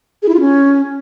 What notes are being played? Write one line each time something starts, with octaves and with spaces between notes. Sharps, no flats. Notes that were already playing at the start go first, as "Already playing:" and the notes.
G#4
E4
F4
C#4